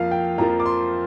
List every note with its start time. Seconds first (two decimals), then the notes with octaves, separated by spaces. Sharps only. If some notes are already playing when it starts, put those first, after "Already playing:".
Already playing: F2 F3 A#3 F5
0.11 G5
0.38 F2 F3 A#3 A#5
0.60 D6
0.66 C6